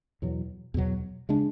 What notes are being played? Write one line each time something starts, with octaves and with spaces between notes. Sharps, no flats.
E2 B2 F#3
E2 B2 F#3
C#3 G#3 D4